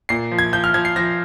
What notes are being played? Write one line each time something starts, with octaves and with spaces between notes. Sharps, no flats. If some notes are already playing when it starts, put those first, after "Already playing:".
A#2 C7
F3
G#6
F3 G6
F6
F3 G#6
C7
F3 A#6